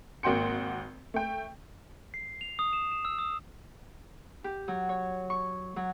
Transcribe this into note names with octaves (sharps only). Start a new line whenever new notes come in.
G#1 A#3 F#4 G5 C6 C#7
A3 G5
C7
F7
D#6
E7
E7
E6
D#6
G4
F#3
C#5
C#6
F#3